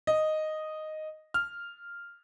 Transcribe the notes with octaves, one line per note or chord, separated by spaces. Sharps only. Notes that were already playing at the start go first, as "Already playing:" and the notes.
D#5
F6